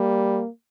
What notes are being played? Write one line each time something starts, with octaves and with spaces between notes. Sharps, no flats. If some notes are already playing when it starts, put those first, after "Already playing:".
Already playing: G3 A#3